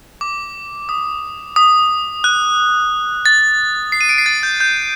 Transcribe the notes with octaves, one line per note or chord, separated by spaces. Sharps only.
D6
D#6
D#6
F#6
A6
C7
D#7
D7
C7
A6
G6
G6